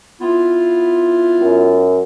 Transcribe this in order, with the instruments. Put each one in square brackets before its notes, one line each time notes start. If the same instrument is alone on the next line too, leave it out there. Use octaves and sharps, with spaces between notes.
[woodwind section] B3 E4 F4
[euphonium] F#2